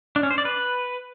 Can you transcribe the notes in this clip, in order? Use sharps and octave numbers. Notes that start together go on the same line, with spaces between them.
D4
C#4
C5
D5
B4